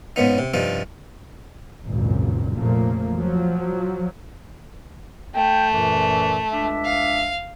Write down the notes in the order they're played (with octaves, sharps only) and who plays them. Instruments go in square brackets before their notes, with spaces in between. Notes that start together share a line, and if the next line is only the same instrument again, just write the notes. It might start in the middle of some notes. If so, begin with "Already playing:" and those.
[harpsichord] G#2 C#3 B3 D#4
C3
G2 C3 F3 D#4
[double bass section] G#1 C#2 F#2 A#2
F1 A#2 C#3 F3 A3 A#3
F3 F#3
[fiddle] A3 [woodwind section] G5
[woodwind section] F#2 A#2 E3
C#2 D4 E5
[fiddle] F5